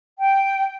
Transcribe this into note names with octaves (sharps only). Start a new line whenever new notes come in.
G5